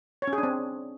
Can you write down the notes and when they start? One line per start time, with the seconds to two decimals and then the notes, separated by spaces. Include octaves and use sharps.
0.22 C#5
0.27 C#4
0.33 G#4
0.38 D4
0.43 C4